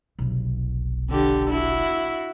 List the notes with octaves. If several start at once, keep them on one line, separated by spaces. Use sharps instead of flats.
F1 B1
D3 G4
E4 F#4